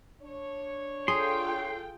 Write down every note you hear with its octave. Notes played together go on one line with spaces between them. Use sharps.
D4 C#5
F4 G#4 A4 G5 C6